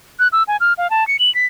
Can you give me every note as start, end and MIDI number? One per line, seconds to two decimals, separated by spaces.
0.19 0.28 90
0.33 0.43 88
0.48 0.57 80
0.60 0.73 89
0.78 0.90 77
0.90 1.07 81
1.08 1.17 97
1.19 1.33 102
1.35 1.46 95